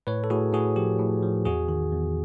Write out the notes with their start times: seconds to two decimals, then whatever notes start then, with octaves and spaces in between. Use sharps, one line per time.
0.07 A2 B4 C#5
0.24 A4
0.30 A2 F#4 G#4
0.53 A2 F#4 G#4
0.76 F3 G4
0.99 A2
1.22 F3
1.45 E2 F#4 G#4
1.69 D#3
1.92 E2